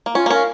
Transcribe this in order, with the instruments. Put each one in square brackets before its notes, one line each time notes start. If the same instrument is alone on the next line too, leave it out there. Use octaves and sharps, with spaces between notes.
[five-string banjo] A#3
[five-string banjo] C#4 [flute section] F4
[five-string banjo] A#3
[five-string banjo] C#4 [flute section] A#4 F5